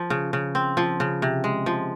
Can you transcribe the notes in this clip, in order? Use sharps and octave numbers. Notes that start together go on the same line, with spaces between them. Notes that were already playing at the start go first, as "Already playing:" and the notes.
Already playing: F3
C#3
C#3
C4
F3
C#3
C3
G#3
F3